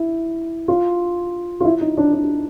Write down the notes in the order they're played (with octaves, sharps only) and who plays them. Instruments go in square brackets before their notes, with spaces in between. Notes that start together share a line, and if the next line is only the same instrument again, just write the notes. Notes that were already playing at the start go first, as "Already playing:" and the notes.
Already playing: [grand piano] E4
F4
F4
E4
D#4
D4
D4